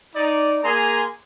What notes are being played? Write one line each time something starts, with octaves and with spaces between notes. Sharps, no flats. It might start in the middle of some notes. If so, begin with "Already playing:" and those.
D#4 D5
A#3 G#4 G#5 A#5 C6